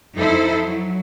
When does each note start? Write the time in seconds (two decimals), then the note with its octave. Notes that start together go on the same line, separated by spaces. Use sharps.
0.14 F2 D#4 E4 A4 C5
0.64 F#3